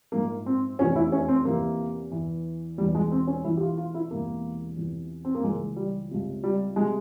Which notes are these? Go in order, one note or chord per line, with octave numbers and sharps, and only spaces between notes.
A#1 G#2 F3 A#3
C4
F1 E2 C3 F3 C#4
E4
C#4
C4
E2 C3 F3 A#3
E2 E3
E1 E2 E3 G3
G#3
C4
C#4
E1 E2 E3 E4
G4
F4
F4
E4
E1 E2 C3 E3 A#3
E2 C3 F3
C4
A#3
C#2 C#3 E3 G#3
G3
C#2 C3 F3
G3
C3 F3 G#3